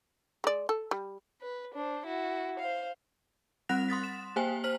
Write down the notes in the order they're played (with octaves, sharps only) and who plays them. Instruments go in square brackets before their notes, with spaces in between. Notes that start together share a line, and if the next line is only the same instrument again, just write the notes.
[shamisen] G#3 D5
A4
G3
[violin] B4
D4 C5
E4 F#4
C5 F5
[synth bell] G3 C4 F#5 F#6 A#6 F7
C6 D#6 A6 B6
E7
A#3 G4 C5 G5 G#5
C5 F6 F#7